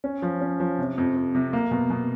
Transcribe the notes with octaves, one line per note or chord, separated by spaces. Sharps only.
C#4
F3
C#4
F3
C3
F2
F2
C3
A#3
B2
B2